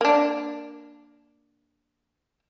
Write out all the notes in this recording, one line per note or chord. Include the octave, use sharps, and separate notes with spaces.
A#3 D4